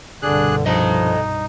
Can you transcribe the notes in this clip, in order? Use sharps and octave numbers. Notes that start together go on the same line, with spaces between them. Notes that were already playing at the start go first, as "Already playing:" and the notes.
C2 G2 B2 D3 D4 G#4 F#6
F3 D#4 A4 D#5